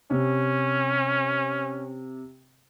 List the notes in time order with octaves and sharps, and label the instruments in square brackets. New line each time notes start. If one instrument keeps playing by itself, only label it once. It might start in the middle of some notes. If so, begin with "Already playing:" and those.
[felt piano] C3 [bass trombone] C#4